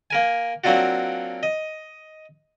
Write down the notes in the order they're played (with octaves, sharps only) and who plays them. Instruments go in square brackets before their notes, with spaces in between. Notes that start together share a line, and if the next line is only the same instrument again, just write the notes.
[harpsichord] A#3 A#4 G#5
F#3 A#3 C4 D4 F4 F#4
D#5